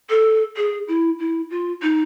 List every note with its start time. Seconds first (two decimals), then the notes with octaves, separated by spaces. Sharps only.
0.09 A4
0.56 G#4
0.88 E4
1.19 E4
1.49 F4
1.82 D#4